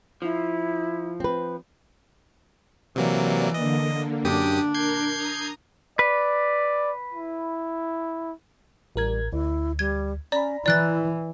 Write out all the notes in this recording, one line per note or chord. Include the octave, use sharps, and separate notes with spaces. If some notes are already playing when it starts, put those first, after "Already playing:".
F3 E4
C4 B4
C3 E3 F#3 A#3 D5
D3 A#3 D#5
F#2 D4 G4 D#6
A#4 G6 G#6 C7
A#5 D#6
B4 D5
E4
A1 G3 A#4 G#6
D2 E4
G3 G#6
C#4 D5 A#5 B5
E3 E4 D5 F#6 A6